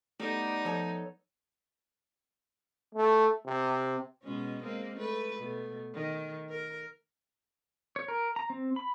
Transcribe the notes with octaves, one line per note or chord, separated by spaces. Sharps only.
G3 A3 B3 D#4 D5
F3 A4 C#5
A3
C3
B2 G#3 C#4
G#3 A#3 C4
A3 B4
B2 A3
D#3
A#4
C#5
A#4
A#5
C4
B5